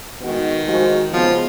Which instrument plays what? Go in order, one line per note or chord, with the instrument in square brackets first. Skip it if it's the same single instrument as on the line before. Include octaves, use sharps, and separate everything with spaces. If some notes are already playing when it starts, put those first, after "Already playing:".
[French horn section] B2 G#3 D#4 F#4 [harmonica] D#3
[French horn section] F3 G#3 D#4 F#4
[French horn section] F2 C#3 G#3 B3 [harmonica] F3